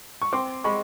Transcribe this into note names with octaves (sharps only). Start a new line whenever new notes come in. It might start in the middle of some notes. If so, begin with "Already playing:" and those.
C#6
C4 C6 D6
G#3 B5 C#6